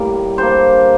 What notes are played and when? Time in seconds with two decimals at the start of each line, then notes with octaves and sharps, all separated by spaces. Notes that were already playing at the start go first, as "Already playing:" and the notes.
Already playing: A2 G3 A#3 A#4
0.38 D3 G3 A#3 C5